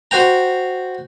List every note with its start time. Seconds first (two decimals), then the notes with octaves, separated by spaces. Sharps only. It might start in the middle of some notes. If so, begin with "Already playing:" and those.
0.11 F#4 C5 G5 A#5